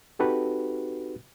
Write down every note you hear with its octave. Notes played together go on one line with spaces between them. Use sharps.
C4 D#4 F#4 G4 A4 B4